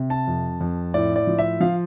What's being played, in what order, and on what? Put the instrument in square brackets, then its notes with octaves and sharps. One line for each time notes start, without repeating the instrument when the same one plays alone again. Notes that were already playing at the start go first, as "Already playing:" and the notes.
Already playing: [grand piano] C3
A5
F2
F2
A2 D5
D5
F3
E5
F3 F5